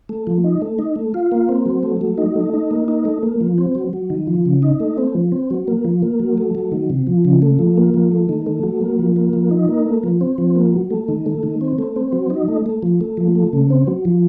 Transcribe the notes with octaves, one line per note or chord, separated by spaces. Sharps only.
A3
F3
D#4
A3
D#4
A3
F4
A#3
C4
F#3
A3
F#3
D#4
A3
D#4
A#3
D#4
A3
A#3
F3
C4
F#3
F#3
D#3
F3
C#3
D#4
A3
C4
F3
C4
F#3
A#3
F3
A#3
F#3
A3
F#3
D#3
C3
F3
C#3
A3
F3
A#3
F3
A3
D#3
A3
F#3
A#3
F3
A#3
F3
D#4
A#3
A3
F3
C4
F3
A#3
F#3
A3
D#3
A3
D#3
C4
A3
C4
F#3
D#4
A3
A3
F3
A3
F3
A3
C#3
C4
F#3
F3